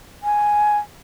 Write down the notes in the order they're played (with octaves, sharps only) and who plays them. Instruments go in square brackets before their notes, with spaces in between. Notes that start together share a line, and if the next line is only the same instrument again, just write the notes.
[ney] G#5